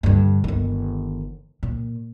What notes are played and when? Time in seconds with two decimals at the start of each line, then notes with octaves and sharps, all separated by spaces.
0.03 G2 D3
0.44 G1 D#3
1.63 A#2